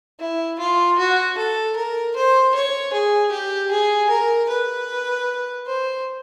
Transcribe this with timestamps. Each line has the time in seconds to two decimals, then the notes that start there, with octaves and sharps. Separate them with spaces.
0.19 E4
0.59 F4
0.98 F#4
1.37 A4
1.76 A#4
2.15 C5
2.54 C#5
2.93 G#4
3.31 G4
3.71 G#4
4.09 A#4
4.49 B4
5.66 C5